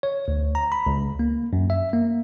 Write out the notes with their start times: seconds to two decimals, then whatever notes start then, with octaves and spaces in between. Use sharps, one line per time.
0.03 C#5
0.28 D2
0.55 A#5
0.72 B5
0.86 C#2
1.19 A#3
1.53 F#2
1.70 E5
1.93 A#3